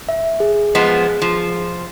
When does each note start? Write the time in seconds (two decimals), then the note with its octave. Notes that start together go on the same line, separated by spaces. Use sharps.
0.09 E5
0.40 G#4
0.75 F3 G#3 B3
1.22 F3